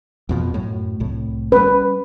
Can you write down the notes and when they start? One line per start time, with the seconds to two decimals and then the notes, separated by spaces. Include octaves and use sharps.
0.29 F2 B2 F3
0.54 F#2 A2
1.00 C2 A2
1.52 G3 B3 C#4 B4